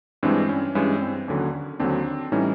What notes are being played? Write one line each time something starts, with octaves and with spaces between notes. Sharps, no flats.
G2 E3 G#3 C4 D4
C#4
G2 E3 G#3 C#4
C4
D#2 D3 F#3 C#4
D#2 D3 F#3 C4 D4
A2 E3 G3 C#4 D#4